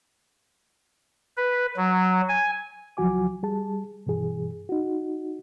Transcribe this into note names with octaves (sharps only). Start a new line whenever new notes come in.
B4
F#3
G#5
C#2 F3 F#3 F#4 G#5 D6
G3 G#4 A5
G2 B2 E3 G#4
D#4 F#4